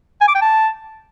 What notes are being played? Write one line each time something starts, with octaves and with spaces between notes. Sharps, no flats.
G#5
D6
G5
A5